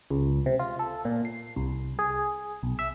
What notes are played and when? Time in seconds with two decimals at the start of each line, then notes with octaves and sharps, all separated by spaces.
0.10 C#2
0.46 C3
0.59 F4
0.79 A4
1.05 A#2
1.25 C7
1.56 C2
1.99 G#4
2.63 B1
2.79 E5